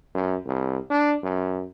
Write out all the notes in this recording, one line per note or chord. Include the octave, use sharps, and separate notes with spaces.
F#2
C2
D4
F#2